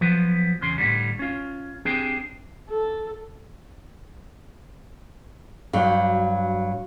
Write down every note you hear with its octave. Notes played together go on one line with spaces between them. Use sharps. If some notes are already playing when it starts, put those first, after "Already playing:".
F3 F#3 B3
E2 C#3 C6
A2 D3 G3
C#4 F4
C4 D4 G4 G#4
A4
G2 F#3 F#4 F5